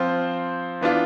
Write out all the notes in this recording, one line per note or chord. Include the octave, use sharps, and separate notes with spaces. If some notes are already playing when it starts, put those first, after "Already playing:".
Already playing: F3 C4 F4 C5
E3 B3 D4 F4